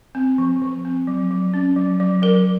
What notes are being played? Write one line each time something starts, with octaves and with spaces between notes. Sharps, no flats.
C4
F3
F3
C4
F#3
F#3
C#4
F#3
F#3
F#3 A#4